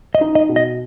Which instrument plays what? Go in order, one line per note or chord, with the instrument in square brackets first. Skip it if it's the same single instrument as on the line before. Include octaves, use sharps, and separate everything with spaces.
[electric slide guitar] D#5
[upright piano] D#4
[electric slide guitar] D#5
[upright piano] B2
[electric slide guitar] D#5